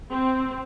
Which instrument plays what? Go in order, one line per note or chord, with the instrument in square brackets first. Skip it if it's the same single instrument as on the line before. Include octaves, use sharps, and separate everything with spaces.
[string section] C4